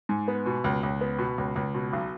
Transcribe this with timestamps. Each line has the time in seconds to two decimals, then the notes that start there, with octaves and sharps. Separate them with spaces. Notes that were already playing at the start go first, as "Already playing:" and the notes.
0.09 G#2
0.28 B3
0.46 B2
0.64 C#2
0.83 C#2
1.01 B3
1.19 B2
1.38 C#2
1.56 C#2
1.74 B2
1.93 B1